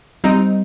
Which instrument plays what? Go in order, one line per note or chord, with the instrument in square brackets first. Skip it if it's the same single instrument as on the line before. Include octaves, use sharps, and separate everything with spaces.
[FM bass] G3 [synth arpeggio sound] C4 D#4